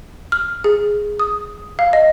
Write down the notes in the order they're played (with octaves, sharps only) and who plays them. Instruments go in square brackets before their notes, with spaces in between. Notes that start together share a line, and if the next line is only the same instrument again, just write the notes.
[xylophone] F6
G#4
D#6
F5
D#5